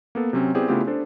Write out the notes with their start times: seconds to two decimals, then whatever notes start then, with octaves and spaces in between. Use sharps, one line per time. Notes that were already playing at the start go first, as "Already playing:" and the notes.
0.15 A#3 B3 A4
0.33 C3 F#3 C4 C#4
0.54 B3 C4 E4 G4 G#4 D5
0.68 C#3 A3 B3 E4 F4 G4
0.87 D4 A4 C5